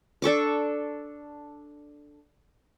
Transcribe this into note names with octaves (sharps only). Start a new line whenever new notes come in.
D4 A4 C#6 D6